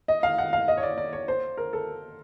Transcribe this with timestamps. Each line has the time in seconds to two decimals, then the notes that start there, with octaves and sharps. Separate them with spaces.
0.08 D#5
0.23 F5
0.38 F#5
0.53 F5
0.68 D#5
0.77 C#5
0.83 D5
0.98 D5
1.13 C#5
1.28 C5
1.57 A#4
1.73 A4